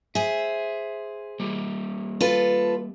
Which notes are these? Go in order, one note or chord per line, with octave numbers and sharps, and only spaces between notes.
G#4 C5 E5
G3 A#3 G4
F4 A4 B4